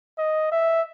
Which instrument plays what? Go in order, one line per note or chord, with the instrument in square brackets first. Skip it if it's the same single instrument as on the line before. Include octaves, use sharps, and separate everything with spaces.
[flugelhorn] D#5
E5